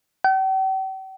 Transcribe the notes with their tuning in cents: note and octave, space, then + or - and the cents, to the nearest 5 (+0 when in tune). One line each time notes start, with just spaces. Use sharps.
G5 -45